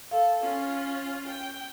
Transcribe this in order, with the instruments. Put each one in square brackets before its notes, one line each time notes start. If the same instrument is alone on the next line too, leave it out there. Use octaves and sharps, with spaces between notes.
[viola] A4 [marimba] F5
[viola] C#4 F4
G5